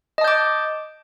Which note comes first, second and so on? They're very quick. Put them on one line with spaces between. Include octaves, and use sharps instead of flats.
D#5 A5 G6 D6